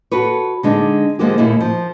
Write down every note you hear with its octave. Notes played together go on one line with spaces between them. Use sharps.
F#4 A4 B4 C#5
D3 G#3 D4 D#4
D#3 F3 G#3 A#3 F#4 G4
D#2 A#2 A3 A#3 E4
F3